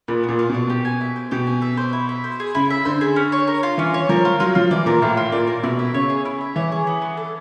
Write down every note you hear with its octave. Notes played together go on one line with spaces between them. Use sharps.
A#2 B3
B3
A#2
F4
B2 D4
G4
G#5
E5
C5
B2 G4
G#5
E5
C5
E4
E5
C5
G#4
C#3 E4
E5
D3 C5
G#4
C#4
C#5
A#4
F4
E3 C#4
C#5
F3 A#4
F4
F#3 F4
F3 F4
E3 D5
A#2 A#4
A2 F4
F4
A#2 D5
A#4
B2 E4
E5
C#3 C#5
G#4
E4
E5
E3 C#5
G#4
B3
B3
A4